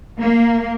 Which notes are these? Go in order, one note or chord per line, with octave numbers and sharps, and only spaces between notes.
A#3